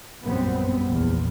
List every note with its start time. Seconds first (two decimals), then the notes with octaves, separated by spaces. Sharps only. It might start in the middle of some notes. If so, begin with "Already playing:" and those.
0.24 A#1 F#2 G3 B3 C4
0.87 A#1 E2